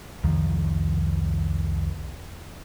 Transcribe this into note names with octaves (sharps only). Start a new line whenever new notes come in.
C2 F2 D#3 F3